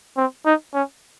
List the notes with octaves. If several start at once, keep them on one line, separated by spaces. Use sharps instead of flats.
C4
D#4
C#4